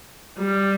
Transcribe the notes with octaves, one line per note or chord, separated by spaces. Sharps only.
G3